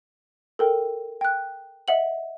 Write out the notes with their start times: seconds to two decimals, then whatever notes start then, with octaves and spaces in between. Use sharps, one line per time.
0.59 A4 A#4 G5
1.21 G5 F#6
1.88 D#5 E5 F#5 F#7